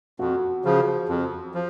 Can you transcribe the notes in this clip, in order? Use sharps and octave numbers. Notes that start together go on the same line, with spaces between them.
F2 F#4
C#3 F3
F2
F3